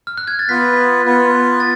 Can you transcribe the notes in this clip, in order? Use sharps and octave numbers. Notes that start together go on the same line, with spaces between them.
F6
F#6
G#6
A6
B3 F4 B4 B6
B3 F4 B4
A6